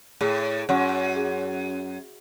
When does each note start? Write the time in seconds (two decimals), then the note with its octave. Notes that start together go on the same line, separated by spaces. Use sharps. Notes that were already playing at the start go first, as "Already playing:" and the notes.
0.21 A2 G#4
0.69 F#2 C#5 F#5 C#6
1.16 G#4